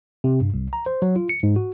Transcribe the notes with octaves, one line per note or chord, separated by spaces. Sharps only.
C3
G2
C2
A#5
C5
F#3
F4
C#7
G#2
F#4